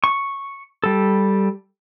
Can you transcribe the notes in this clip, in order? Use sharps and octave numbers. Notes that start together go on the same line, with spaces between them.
C#6
G3 A4